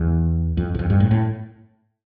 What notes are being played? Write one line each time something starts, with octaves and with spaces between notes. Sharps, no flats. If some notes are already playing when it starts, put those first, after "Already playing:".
Already playing: E2
F2
E2
F2
G2
A2
A2